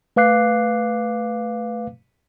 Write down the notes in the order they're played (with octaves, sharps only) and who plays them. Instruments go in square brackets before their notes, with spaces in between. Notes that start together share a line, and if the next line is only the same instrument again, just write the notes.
[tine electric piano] A3 B4 F5 D6 F#6 C7